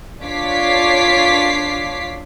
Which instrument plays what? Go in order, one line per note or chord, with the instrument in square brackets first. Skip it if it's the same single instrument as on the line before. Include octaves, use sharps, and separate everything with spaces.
[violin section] D4 F4 C#5 D6 B6 C7